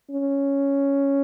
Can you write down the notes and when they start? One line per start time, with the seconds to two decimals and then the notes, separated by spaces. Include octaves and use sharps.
0.11 C#4